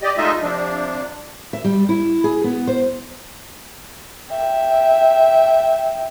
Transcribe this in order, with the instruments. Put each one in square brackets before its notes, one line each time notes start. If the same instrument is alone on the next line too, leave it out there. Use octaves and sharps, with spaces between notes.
[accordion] G4 D5 D#5
G#3 A3 D#4 F4 D#5 E5
C3 F3 D4
[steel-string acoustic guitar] E5
G3
E4
G#4
B3
C5
[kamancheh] E5 G5